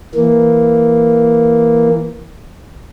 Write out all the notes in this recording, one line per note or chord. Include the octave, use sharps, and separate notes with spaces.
E3 A#3